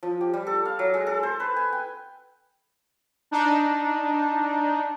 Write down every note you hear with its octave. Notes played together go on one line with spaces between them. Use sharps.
F3
G4
G3
A4
F5
F#3
G#3
A4
C5
B4
G#5
G5
D4 D#4